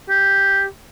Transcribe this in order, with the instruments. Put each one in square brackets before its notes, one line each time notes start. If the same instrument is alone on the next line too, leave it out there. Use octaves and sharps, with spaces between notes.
[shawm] G4